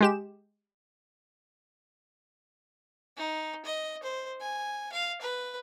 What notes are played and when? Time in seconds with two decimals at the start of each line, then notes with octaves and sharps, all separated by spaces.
0.01 G#3 G4 E7
3.17 D#4
3.66 D#5
4.03 C5
4.41 G#5
4.92 F5
5.21 B4